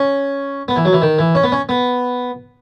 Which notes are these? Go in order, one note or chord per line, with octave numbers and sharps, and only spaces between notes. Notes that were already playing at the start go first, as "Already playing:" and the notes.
Already playing: C#4
B3
E3
F#3
E3
D#3
E3
C#4
B3
C#4
B3